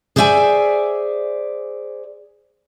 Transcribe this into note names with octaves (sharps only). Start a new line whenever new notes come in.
G#4 C5 D5 E5 F#5 G#5